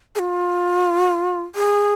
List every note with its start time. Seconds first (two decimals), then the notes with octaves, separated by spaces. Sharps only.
0.15 G#4
0.19 F4
1.55 G#4